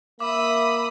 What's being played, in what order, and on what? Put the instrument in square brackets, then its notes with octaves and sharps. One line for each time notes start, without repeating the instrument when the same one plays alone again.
[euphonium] A#3 [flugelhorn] E5 [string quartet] B5 D#6 [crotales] D6